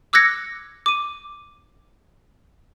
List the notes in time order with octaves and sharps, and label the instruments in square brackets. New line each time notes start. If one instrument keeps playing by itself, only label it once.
[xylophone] D6 E6 F#6 G#6 A#6 C#7
D6 D#7